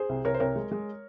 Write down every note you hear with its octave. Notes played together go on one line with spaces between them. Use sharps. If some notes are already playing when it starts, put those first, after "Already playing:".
Already playing: G#4 C5
C2
C2 A#4 C#5
C5
C2 A#4 C#5
G#3
G#3